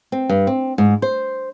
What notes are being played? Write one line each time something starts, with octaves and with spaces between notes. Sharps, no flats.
C4
G2
C4
G#2
C5